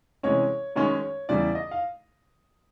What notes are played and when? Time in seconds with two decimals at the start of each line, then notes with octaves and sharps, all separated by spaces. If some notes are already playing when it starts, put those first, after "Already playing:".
0.23 C3 E3 G#3 C#4 C#5
0.76 F#2 D#3 G#3 C#4 C#5
1.29 E2 C#3 E3 G3 D5
1.55 D#5
1.71 F5